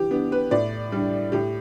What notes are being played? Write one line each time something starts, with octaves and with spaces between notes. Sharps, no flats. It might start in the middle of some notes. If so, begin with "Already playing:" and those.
Already playing: E3 G4
B3 D4
B4
A2 D5
G3 D4
A2 G4